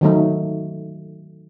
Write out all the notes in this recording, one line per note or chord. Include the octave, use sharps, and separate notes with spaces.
D#3 F#3 A3 D#4